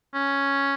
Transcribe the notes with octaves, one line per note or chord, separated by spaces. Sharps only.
C#4